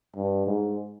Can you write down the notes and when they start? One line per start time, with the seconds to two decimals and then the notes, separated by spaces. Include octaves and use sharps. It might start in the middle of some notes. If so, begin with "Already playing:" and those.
0.16 G2
0.47 G#2